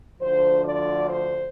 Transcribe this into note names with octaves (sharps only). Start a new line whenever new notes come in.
D2 D3 F3 C5
D5
C5